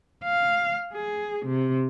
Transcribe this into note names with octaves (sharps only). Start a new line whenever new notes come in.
F5
G#4
C3